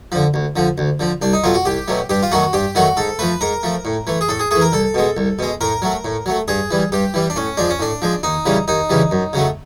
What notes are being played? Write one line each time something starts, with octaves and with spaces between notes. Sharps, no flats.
D3 F3
D2
D3 F3
D2
D3 F3
C2 D4
D#4
B2 F#3 A3 F4
F#4
C2 G4
B2 F#3 A3
G2 G4
F4
D#3 F#3 A3 F#4
G2 G4
D#3 F#3 A3 F#4
G#2 A4
F3 A3 B4
G#2 A#4
F3 A3
A2
E3 A3
G#4
A2 A4
G#4
E3 A3 G#4
A#4
C2 A4
B2 G#3
C2
B2 G#3
A2 A#4
F#3 A3
A2
F#3 A3
G2 G#4
E3 G3
G2 G4
E3 G3
D4
A2 C#4
F3 G#3 D4
C#4
A2 D4
F3 G#3
D#2 D#4
C#3 E3 G3
D#2 D#4
C#3 E3 G3
F#2
C#3 F#3 A3